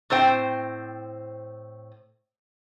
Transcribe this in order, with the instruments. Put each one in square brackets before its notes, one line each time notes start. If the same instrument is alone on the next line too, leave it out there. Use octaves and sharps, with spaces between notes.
[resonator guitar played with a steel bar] A2 C4 C5 G5